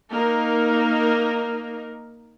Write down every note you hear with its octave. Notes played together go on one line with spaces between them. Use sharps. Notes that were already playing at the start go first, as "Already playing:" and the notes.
A#3 D#4 A#4